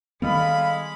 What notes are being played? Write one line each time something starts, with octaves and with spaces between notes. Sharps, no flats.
D#3 G3 G#3 B3 A4 D#5 F5 B5